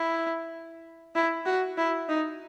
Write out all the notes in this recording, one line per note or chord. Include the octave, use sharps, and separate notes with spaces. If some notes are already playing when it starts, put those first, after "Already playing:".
Already playing: E4
E4
F#4
E4
D#4